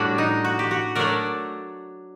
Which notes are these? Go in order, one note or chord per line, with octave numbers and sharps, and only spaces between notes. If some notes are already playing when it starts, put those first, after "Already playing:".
Already playing: A2 G3 D4 F#4
D#4
F#4
G4
F#4
F#3 A3 D4 A#4 D5